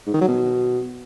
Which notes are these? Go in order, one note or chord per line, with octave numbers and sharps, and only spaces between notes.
G#2
D#3
F#3
B2